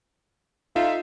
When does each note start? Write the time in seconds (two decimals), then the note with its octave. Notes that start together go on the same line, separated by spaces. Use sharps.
0.76 D#4 F4 A4 E5